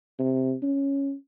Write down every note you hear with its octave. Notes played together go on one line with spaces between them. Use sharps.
C3
C#4